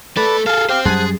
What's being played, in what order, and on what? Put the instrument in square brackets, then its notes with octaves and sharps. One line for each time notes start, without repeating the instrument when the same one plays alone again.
[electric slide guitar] A3 A4 [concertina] B4 D5 A5
[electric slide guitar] G#4 A4 [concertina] F5
[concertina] G4 F5 [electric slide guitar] C5 G5
[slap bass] F#2 G3 [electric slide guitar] G#4 [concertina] C5 F#5 A5